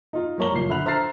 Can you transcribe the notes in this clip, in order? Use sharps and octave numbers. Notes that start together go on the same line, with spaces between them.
D#4 F4
G3 A#3 C#5 A#5 G7
F#1 A#2 C7
D3 E5 B5 F#6 F7
C5 E5 A#5 F6 A6 C7